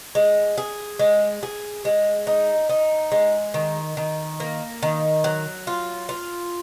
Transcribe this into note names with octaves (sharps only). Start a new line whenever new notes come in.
G#3
G#4
G#3
G#4
G#3
D#4
D#4
G#3
D#3
D#3
A#3
D#3
F#3
F4
F4